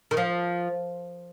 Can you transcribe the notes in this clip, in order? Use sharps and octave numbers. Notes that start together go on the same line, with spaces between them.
D#3
F3